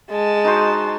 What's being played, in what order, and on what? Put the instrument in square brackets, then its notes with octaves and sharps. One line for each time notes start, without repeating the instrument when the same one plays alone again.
[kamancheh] G#3 A5
[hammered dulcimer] D#4 F#4 C5